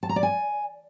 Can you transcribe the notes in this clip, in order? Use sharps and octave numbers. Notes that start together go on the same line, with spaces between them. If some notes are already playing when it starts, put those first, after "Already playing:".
A5
A#5
D5
G#5